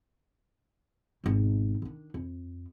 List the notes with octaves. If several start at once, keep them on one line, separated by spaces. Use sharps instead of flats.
G#1 B2
D#3 D4
F2